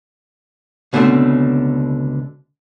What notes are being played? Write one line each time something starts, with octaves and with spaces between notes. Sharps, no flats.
C#2 B2 D3 G3 A3 C4